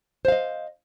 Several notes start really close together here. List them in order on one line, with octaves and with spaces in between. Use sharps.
C5 F5 D#5